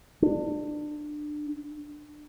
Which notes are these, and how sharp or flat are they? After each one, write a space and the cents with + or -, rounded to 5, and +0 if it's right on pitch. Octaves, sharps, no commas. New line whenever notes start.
D4 +25